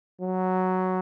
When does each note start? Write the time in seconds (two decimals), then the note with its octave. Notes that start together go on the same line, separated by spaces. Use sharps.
0.22 F#3